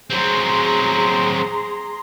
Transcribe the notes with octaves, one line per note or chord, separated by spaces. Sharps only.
F#3 C4 G#4 A#5 C6